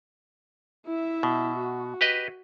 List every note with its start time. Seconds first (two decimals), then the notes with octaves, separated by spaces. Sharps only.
0.86 E4 E5
1.23 B2
1.58 F#4
2.01 G4 B4 D#5